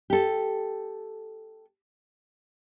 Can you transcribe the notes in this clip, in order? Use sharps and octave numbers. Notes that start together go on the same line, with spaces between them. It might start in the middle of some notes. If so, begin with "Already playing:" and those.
G4 A4